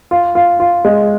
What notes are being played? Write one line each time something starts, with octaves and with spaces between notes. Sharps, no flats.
F4
F4
F4
G#3